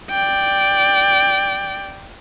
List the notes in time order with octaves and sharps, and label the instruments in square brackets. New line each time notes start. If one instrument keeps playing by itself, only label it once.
[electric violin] D5 G5